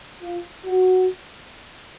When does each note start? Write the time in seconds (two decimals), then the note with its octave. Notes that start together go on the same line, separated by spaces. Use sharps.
0.22 F4
0.65 F#4